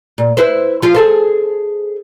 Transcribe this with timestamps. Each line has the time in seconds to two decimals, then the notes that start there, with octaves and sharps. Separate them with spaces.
0.18 A#2
0.37 E4 B4 C5
0.82 F3 F4
0.95 G#4 A4 C5